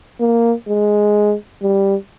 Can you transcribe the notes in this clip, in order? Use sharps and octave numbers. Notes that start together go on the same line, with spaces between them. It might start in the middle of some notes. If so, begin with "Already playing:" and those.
A#3
G#3
G3